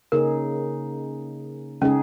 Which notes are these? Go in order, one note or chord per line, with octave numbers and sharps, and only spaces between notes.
C#3 A#3 D#4 G#4 A#4
C#3 G#3 C#4 D#4 G#4